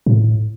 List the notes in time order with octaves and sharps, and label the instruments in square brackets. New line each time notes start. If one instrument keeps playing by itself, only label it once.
[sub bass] A2